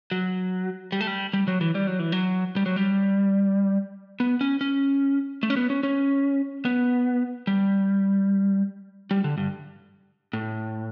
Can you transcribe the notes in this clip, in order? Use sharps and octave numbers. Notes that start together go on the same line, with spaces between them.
F#3
G3
A3
G3
G3
F#3
E3
G3
F#3
E3
F#3
G3
F#3
G3
B3
C#4
C#4
A3
C#4
B3
C#4
C#4
B3
G3
G3
D3
G2
A2